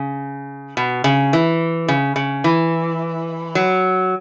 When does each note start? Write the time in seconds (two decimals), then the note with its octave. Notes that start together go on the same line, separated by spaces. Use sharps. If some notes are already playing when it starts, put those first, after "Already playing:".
Already playing: C#3
0.77 B2
1.04 C#3
1.33 E3
1.88 C#3
2.16 C#3
2.44 E3
3.55 F#3